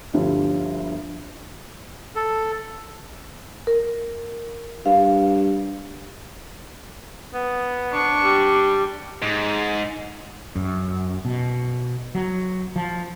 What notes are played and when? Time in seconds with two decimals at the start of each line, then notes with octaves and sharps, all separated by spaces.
0.14 G1 D2 F3 G3
2.16 A4
3.67 A#4
4.86 G2 F5
7.34 B3
7.92 D4 C#6
8.22 G3
9.22 G#2
10.56 F#2
11.25 B2
12.15 F#3
12.76 F3